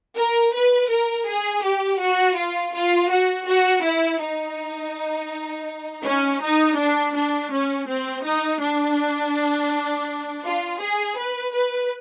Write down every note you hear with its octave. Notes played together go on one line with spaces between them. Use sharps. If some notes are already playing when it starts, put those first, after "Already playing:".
A#4
B4
A#4
G#4
G4
F#4
F4
F4
F#4
F#4
E4
D#4
C#4
D#4
D4
D4
C#4
C4
D#4
D4
F4
G#4
B4
B4